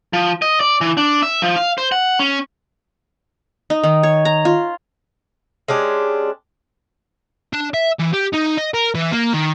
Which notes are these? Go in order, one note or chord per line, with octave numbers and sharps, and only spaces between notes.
F3
D#5
D5
E3
D4
E5
F3
F5
C5
F#5
C#4
D#4
D#3
C#5
A#5
F4
G#3 C#4 D4 G4
D4
E5
E3
G4
D#4
D#5
A#4
E3
A#3
D#3